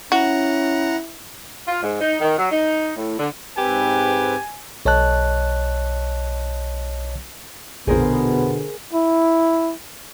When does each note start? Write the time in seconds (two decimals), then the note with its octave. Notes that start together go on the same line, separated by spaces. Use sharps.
0.12 C#4 E4 F#4 F#5 A#5
1.68 F4
1.83 G#2
2.01 D#4
2.21 D#3
2.37 F#3
2.52 D#4
2.97 A2
3.19 D3
3.58 G#2 C4 G4 B4 G#5
4.85 B1 C#5 D#5 A5 F#6
7.87 A#1 F2 B2 D3 B3 G#4 A#4 C5
8.93 E4